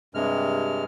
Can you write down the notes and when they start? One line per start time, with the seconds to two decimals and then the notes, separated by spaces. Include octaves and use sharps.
0.15 G2 C3 G#3 F6